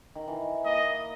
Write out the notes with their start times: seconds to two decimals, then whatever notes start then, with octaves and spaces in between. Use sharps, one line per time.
0.15 D#3
0.28 E3
0.65 A#3 D#5